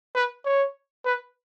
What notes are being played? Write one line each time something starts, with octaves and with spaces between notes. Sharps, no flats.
B4
C#5
B4